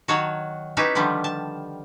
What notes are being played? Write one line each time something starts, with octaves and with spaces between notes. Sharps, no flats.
D#3 F#3 F#4 C#5 A5
C#4 D#4 E4 G4 B4 E5
D3 D#3 F3 G3
A5